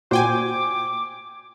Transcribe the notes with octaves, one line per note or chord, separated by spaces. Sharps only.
A#2 F#4 C5 G5 G#5 D6